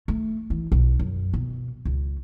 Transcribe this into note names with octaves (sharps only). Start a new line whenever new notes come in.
A3
E3
B1
F#2
B2
C#2